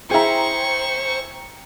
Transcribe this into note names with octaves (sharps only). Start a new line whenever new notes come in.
E4 G#4 C5 G5 A#5 C#6